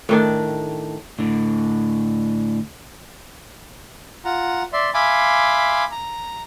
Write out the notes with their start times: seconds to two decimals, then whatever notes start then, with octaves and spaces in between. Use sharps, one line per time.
0.09 A2 D#3 D4
1.19 A2 D3
4.25 F4 F#5 A#5
4.73 D5 E5 C6
4.94 E5 F5 G#5 B5 C6 D6
5.91 A#5